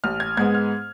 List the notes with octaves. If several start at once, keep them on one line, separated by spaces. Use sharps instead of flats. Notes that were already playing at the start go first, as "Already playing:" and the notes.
A1 F6
G#6
G#2 G#3 B3 G#6
F6